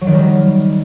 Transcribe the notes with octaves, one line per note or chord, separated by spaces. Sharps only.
F#3
D#3
G3